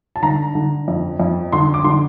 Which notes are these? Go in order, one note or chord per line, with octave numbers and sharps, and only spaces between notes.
A5
D3 A#5
D3
F2
F2
D3 C6
D6
D3 C6